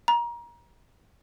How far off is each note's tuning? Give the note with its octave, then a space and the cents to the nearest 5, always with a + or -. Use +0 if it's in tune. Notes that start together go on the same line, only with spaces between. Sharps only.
A#5 +25